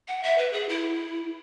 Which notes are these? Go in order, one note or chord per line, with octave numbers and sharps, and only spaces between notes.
F#5
E5
B4
G#4
E4